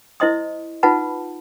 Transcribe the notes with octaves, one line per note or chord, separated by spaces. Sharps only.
E4 C5 D#5 C6 D#6
D#4 F4 B4 F#5 A5 B5